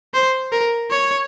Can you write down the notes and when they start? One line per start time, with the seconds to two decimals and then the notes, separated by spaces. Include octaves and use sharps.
0.14 C5
0.52 A#4
0.91 C#5